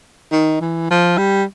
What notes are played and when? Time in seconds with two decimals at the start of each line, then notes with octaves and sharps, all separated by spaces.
0.32 D#3
0.61 E3
0.90 F3
1.18 G3